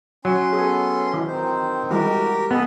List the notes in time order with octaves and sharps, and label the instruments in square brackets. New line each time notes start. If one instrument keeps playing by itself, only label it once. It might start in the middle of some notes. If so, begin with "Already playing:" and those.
[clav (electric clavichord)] F#3 [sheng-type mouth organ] C#4 C6
[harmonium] B3 A4 [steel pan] G#4
[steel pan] E3 [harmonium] G#3
[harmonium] D#3 C4 D#4 [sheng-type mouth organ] C5
[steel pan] E3 G3 G#3 [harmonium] F#4 [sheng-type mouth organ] G4 A#4
[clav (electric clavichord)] B3 [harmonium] C#4 D#5 [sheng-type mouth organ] A4